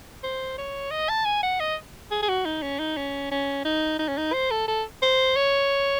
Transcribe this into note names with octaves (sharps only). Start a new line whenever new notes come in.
C5
C#5
D#5
A5
G#5
F#5
D#5
G#4
G#4
F#4
D#4
C#4
D#4
C#4
C#4
D#4
D#4
C#4
D#4
C5
A4
A4
C5
C#5